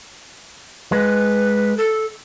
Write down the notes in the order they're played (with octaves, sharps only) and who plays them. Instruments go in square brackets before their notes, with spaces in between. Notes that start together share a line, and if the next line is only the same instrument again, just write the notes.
[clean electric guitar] G#3 [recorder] B4
[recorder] A4